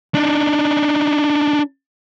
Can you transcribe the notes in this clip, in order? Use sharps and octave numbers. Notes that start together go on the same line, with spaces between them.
D4 D#4